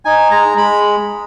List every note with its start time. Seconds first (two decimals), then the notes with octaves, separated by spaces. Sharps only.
0.05 D#4 G#5
0.31 G#3 A#5
0.57 G#3 B5